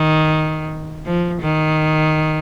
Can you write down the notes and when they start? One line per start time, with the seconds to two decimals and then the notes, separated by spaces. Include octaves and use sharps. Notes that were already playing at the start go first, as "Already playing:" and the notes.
Already playing: D#3
1.06 F3
1.41 D#3